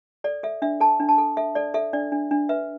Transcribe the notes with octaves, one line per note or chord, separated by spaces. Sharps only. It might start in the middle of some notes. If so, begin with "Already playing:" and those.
A4 D5
A4 E5
D4 E5
A4 A5
D4
A5
A4
A4 E5
A4 D5
A4 E5
D4 D5
D4
D4
B4 E5